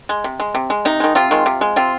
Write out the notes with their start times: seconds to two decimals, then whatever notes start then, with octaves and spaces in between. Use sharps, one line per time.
0.09 G#3
0.24 C3
0.40 G#3
0.55 C3
0.70 G#3
0.85 C3 D#4
1.00 D#3 G#3
1.15 C3 C4 F4
1.31 D#3 G#3
1.46 C3
1.61 G#3
1.76 C3 C4 F4